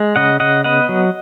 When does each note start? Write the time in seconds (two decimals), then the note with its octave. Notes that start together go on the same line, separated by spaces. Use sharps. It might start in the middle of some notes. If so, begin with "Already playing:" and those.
Already playing: G#3
0.16 C#3 D#5 F#5
0.40 C#3 D#5 F#5
0.64 B3 D#5 F#5
0.89 F#3